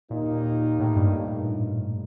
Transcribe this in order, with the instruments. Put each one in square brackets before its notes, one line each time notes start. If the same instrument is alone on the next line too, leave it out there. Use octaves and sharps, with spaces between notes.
[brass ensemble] D#2 D#3 A#3 D#4 [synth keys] A#2
[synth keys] A2
G2